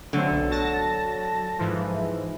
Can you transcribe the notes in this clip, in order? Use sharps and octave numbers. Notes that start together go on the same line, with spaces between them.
D3 F#3 A3 C4
B1
F#3 A5 A#6
G#2 E3 F3